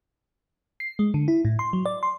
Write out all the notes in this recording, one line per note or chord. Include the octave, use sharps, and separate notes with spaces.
C7
G#3
D3
E4
A2
C6
F#3
D5
C6